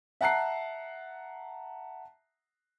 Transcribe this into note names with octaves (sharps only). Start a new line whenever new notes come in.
E5 F#5 A5 A#5 F#6 C7